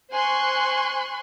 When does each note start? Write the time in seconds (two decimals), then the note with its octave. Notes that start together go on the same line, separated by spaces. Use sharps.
0.12 C5 G#5 C6 C#6 F#6